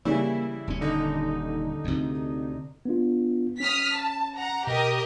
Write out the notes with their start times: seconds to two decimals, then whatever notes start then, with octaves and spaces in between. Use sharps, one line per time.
0.05 C#3 E3 G3 A#3 E4
0.67 D#1 C#4
0.81 D3 D#4
1.84 D2 C3
2.85 B3 D4 F4
3.60 C#4 D#6 F6 B6
3.94 A5
4.36 F#5 A#5
4.67 B2 G4 A#4 D#5